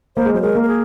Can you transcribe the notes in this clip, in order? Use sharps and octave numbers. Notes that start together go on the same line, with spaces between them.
A#3 C5
G#3
F#3 C5
G#3 A#4
A#3
A#4
G#4